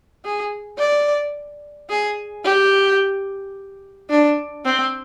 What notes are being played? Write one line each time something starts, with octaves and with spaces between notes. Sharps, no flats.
G#4
D5
G#4
G4
D4
C4